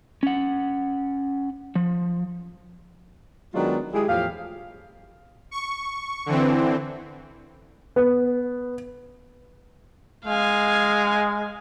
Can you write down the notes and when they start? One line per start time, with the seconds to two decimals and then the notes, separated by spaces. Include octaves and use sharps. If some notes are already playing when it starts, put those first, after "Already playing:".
0.23 C#4 F#5
1.75 F3
3.54 D#3 F#3 G#3 B3 D4 F4
3.93 G#3 E4 G4 G#4
4.08 E2 A2 F3 G4 F5
5.51 C#6
6.26 D3 E3 C4
7.96 B3
10.26 G#3 F5 G#5